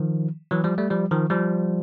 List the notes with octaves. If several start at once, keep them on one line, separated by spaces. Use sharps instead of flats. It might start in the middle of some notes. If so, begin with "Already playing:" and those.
Already playing: D#3 F3
E3 F#3
F3 G3
G3 A3
F3 G3
D#3 F3
F3 G3